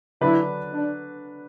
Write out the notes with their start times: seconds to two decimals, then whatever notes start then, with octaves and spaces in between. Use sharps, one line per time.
0.21 D3 F#3 D4 E4 B4
0.72 D4